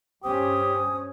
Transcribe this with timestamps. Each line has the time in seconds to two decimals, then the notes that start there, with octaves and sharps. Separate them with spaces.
0.24 G2 C#4 G4 C5 D#6